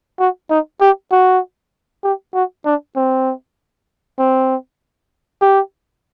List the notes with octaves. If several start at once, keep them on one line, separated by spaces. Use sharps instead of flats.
F#4
D#4
G4
F#4
G4
F#4
D4
C4
C4
G4